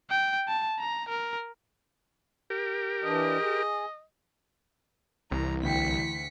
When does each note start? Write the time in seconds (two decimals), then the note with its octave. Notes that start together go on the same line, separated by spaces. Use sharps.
0.10 G5
0.48 A5
0.79 A#5
1.09 A#4
2.50 G4 A#4
3.04 E3 D4 D#5
3.41 G#4
5.31 C2 E3 A#5
5.63 D2 G5 B6 C#7